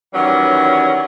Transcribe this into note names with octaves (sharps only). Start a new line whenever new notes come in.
D#3 E3 F#3 G3 C#4